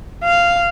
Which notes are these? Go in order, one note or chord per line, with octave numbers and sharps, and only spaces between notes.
F5